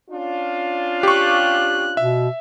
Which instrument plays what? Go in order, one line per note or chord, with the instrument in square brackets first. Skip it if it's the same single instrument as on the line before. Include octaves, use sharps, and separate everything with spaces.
[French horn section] C#4 D4 F4
[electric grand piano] G4 C#6 [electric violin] F#6
[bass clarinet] B2 [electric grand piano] E5